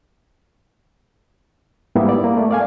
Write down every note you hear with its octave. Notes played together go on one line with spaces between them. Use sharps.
G#2 G3 A#3 B3 E4
D5
A#3
A3
D5 F5 G#5